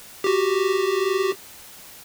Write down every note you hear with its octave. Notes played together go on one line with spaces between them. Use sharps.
F#4 G4